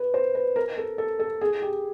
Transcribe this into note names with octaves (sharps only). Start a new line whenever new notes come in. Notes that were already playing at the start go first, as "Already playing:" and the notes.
Already playing: B4
C5
B4
A#4
A4
A4
A4
G#4
G4